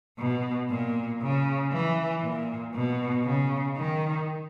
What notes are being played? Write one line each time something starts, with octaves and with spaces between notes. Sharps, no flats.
B2
A#2
C#3
E3
A#2
B2
C#3
D#3